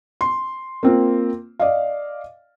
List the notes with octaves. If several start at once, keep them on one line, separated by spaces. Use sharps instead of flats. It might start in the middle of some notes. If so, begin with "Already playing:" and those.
C6
A#3 C4 F4
D5 D#5 F5